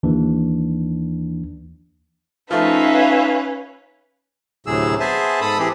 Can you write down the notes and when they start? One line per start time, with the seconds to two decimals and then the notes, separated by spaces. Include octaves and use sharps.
0.03 D#2 E3 D4
2.51 F3 A3 C#4 D#4 B4 E5 F5
4.66 D2 A2 C3 F#3 G#4 E6
5.00 B3 G#4 C5 E5 G#5 A5
5.41 G#2 A4 A5 B5 D#6
5.58 E3 C4 G4 G#4